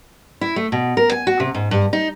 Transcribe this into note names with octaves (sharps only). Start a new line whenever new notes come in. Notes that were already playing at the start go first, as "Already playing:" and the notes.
E4
A3
B2
A#4
G#5
F#4
C3
G#2
G2
D#4